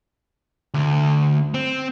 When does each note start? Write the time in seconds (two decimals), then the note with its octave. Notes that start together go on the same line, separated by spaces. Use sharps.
0.74 D2
1.54 C4